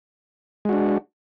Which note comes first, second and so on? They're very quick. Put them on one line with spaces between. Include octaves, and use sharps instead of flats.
G#3 F#4 D4